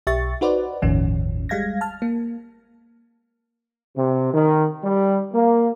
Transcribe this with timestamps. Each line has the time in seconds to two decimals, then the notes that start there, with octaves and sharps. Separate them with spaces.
0.07 B1 G4 E5 C#6 A6
0.41 D#4 F#4 B4 C5 D5
0.82 G1 D#2 A2 D#3 F3 C#4
1.49 G3 G#3 F5 G#6 A#6
1.81 A5 F6
2.02 A#3
3.97 C3
4.33 D#3
4.83 G3
5.33 A#3